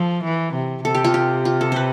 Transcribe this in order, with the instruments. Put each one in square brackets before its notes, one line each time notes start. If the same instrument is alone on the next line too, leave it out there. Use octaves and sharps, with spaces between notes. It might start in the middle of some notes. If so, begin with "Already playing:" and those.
Already playing: [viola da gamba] F3 [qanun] A4
[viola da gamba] E3
C3
[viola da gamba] C3 [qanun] A4
[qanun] G4
F4
G4
F4
A4
B4 C5